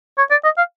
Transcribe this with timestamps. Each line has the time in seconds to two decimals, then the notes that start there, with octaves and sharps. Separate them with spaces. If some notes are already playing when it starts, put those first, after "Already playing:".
0.18 C#5
0.31 D5
0.44 D#5
0.57 F5